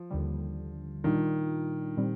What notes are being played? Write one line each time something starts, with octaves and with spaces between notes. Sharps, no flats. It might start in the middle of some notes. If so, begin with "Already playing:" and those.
Already playing: F3
D#2 D3 G3
A#2 D#3 G3 D4 F4
A#2 G3 C4